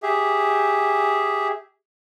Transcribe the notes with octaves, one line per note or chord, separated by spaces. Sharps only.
G4 G#4 E5